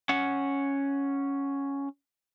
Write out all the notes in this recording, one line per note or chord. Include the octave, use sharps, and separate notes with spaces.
C#4 F#5